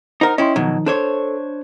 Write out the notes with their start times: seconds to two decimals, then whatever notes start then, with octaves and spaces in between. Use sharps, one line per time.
0.21 D#4 A#4 C5 F#5
0.38 C#4 E4 D#5 G5 C6
0.56 B2 D#3 F3 F#3 D#4
0.86 D4 A4 C5 C#5